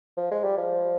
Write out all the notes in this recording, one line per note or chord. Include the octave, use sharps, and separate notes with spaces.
F3
G#3
G3
F3